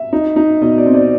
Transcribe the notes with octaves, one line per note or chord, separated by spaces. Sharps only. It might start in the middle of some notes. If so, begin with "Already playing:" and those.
Already playing: E5
D#4
D#4
B2 D#5
D5
C4
D5